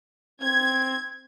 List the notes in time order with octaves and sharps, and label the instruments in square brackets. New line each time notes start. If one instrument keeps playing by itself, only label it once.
[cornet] C4 [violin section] G#6